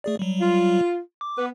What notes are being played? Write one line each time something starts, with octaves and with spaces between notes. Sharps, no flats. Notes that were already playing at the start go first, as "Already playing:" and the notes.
A3 G#4 D5
F#3 G3
F4
D6
B3 B4